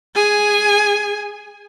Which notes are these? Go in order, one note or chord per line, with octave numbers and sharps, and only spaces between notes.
G#4 G#5